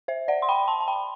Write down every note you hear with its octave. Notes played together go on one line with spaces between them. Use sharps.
C5 E5
D5 F#5
C6
G5 B5
A5 C6
A5
G5 B5